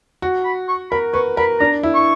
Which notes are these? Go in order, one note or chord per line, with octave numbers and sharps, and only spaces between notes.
F#4
B5
C#6
A#4 B5
B4 C#6
A#4 B5
D4 A#5
E4
C#6